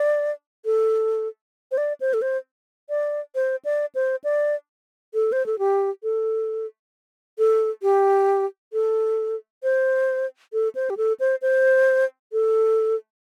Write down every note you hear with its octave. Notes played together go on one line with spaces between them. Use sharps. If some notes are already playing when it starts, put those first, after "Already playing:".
Already playing: D5
A4
C5
D5
C5
A4
C5
D5
C5
D5
C5
D5
A4
C5
A4
G4
A4
A4
G4
A4
C5
A4
C5
G4
A4
C5
C5
A4